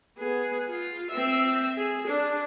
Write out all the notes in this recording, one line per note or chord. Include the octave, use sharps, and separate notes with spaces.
B3 G#4
F4
C4 E5
G#4
D4